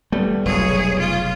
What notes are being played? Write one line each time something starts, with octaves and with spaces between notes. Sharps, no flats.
G3 A3 B3
F1 B1 G#4 C#5
F4